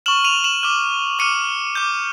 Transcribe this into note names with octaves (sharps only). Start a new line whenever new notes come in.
C#6 F6 E7 F#7
D#7 F7
E7 F#7
D6 F6
D6 F6 C#7 D#7
D6 G6